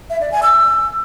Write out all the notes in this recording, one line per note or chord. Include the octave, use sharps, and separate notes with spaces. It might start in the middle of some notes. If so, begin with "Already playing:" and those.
E5
D5
G#5
E6